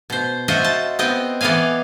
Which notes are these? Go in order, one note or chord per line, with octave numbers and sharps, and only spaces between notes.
B2 C5
F4 F#4 C5 D#5 E5
A5
B3 C4 D#5 G5
E3 B3 D5 D#5 F5 G#5